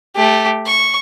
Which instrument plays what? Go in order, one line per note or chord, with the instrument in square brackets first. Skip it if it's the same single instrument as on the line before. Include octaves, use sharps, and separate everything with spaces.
[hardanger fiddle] A3 G4
C#6